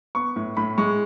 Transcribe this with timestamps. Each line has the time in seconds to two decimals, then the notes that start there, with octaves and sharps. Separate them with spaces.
0.15 B3 C#6
0.36 A2
0.57 A2 B5
0.78 G#3 C#6